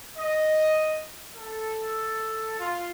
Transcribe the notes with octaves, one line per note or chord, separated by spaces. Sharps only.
D#5
A4
F4